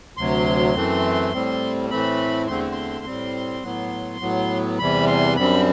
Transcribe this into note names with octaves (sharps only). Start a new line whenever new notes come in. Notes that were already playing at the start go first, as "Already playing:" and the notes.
D2 C3 F#3 C6
F#2 E3 A3 C4
A2 G3 C4
A2 E3 A3 C4 B5
E2 D3 A3 C4 C6
C6
A2 G3 C4
A2 F#3 B3
A2 F#3 B3
E2 C3 E3 G3 B5
C6
F#2 D3 G3 C4 B5